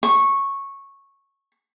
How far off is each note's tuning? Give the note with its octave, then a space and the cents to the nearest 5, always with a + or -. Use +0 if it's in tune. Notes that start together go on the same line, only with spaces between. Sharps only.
C#6 -10